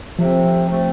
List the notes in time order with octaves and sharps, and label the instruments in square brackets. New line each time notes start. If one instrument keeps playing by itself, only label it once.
[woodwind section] C3 A3 C4 [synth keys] F3
[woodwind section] C3 A3 C4